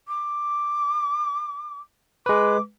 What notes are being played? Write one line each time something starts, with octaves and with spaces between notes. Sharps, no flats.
D6
G#3 B4 D6